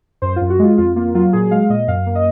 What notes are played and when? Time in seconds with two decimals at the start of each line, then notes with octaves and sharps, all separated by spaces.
0.22 F#2 C5
0.36 F#2 F4
0.50 F#4
0.59 G#3 F4
0.78 F2 F4
0.96 A#3 F4
1.15 F#3 F4
1.33 A#2 G#4
1.51 G#3 F5
1.69 A#2 D#5
1.88 F#2 F5
2.06 A#3
2.15 D#5